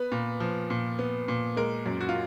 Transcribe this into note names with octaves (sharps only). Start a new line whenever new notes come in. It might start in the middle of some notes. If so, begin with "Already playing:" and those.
Already playing: B3 B4
A#2
F3
A#2
B3
A#2
G#3 A#4
F#2
F#4
F4